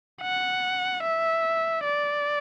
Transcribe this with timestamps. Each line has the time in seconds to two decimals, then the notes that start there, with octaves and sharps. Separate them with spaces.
0.22 F#5
1.03 E5
1.84 D5